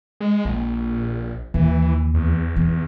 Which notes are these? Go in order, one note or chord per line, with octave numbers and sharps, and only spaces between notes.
G#3
A#1 A#3
D#2 D#3 E3
E2
E3